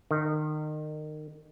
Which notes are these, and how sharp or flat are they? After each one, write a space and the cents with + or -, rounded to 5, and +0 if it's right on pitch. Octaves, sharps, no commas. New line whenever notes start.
D#3 -30